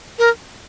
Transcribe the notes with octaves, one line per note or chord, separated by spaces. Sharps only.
A#4